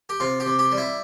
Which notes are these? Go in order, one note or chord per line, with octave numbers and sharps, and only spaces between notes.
G4
C3 F4
G4
C3
G4
G3
E4